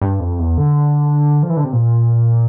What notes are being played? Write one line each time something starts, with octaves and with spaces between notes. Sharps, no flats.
G2
F2
E2
D3
F3
E3
D3
C3
A#2